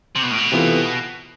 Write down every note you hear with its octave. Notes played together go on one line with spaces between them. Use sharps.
C3
B2
A2
B2
C3 E3 B3 F4 A4